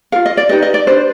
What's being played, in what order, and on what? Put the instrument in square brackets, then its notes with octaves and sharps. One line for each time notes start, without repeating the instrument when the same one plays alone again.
[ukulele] F4 A#4 F5
D#5
D5
D#4 G4 B4 D#5
D#5
D5
D4 G4 B4 C5